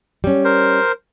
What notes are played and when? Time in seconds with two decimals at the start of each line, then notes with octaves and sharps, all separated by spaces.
0.24 G3 C#4
0.44 A#4 C5